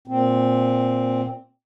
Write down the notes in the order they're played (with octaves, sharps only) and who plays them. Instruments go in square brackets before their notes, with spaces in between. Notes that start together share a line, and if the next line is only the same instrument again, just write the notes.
[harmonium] A#2 C4